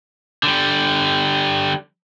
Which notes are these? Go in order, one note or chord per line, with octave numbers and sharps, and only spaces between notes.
D3 G3